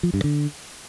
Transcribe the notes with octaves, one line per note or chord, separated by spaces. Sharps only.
F3
G2
D3